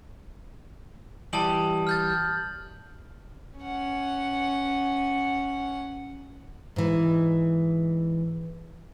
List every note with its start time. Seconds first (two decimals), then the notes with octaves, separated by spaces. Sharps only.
1.33 E3 G3 G4 A5 D#6 F#7
1.87 F6 G6 A6
3.59 C#4 F#5
6.76 G#2 E3